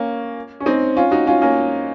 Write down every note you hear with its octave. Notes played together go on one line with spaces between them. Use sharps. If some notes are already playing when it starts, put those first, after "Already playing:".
Already playing: A#3 C#4
C#4
C4 D#4
C#4 F4
D#4 F#4
C#4 F4
A#3 C#4